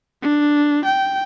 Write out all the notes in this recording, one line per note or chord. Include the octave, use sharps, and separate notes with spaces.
D4
G5